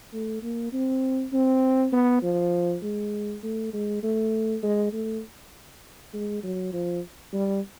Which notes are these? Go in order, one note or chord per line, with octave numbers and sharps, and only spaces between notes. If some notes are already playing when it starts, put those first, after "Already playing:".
A3
A#3
C4
C4
B3
F3
G#3
A3
G#3
A3
G#3
A3
G#3
F#3
F3
G3